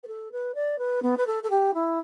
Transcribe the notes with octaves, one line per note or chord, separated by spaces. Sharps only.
B4
A4
B4
D5
B4
B3
B4
A4
A4
G4
E4